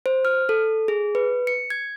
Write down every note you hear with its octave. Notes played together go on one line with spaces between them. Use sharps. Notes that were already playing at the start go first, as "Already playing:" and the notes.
C5
F6
A4
G#4
B4
C#7
G#6